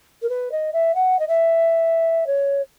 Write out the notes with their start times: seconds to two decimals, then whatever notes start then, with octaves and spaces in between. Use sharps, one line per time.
0.22 A#4
0.29 B4
0.52 D#5
0.73 E5
0.95 F#5
1.19 D#5
1.28 E5
2.27 C#5